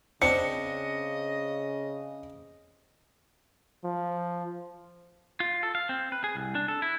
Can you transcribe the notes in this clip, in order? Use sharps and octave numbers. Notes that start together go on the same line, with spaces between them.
C#3 C4 D4 D#5 C#7
F3
F4
A4
F5
C4
B4
G#4
C2
D4
A4
E4